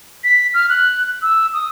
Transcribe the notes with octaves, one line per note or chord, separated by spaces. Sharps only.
B6
F6
F#6
E6
D#6